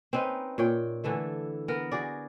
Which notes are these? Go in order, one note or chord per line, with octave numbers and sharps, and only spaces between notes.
C4 C#4 D#4 B4
A#2 C#5 G5
D3 E3 A3 E4
B3 A#4
F#4 G#4 D5